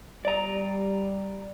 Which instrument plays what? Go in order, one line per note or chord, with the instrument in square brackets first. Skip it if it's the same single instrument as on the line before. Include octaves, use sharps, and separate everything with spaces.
[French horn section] G3 [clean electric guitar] D5 A#5